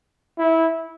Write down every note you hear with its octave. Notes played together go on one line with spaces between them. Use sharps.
E4